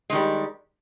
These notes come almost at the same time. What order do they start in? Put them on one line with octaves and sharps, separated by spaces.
G#3 D#3 G3